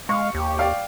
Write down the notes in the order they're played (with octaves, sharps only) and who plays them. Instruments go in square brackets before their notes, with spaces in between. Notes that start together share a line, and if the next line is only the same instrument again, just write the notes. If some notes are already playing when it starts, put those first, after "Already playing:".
[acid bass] G#3 [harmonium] F5 [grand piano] C#6
[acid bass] D#2 [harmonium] G4
[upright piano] D5 F5 G5